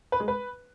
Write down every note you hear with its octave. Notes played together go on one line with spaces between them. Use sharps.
B4
G#3
B4